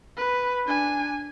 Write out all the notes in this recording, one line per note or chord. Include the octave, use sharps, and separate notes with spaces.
B4
D4 G#5